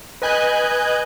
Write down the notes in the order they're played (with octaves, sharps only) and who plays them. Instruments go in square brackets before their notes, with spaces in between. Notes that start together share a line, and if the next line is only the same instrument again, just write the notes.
[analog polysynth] B4 D#5 G#5 F#6 G6